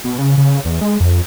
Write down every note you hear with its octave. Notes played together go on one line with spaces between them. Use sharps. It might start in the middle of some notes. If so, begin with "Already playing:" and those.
B2
C#3
C#3
E2
G#3
F2